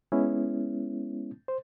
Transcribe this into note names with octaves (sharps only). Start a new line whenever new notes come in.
G#3 B3 C#4 E4
C5